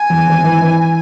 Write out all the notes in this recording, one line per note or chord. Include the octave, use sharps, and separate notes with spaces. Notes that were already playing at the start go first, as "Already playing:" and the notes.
Already playing: G#5
E2
G#1
E3
E3